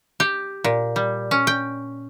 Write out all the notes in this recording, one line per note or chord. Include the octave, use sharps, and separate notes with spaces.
G4
A#2
G3
C#4
G5